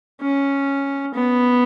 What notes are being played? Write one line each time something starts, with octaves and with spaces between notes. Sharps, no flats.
C#4
B3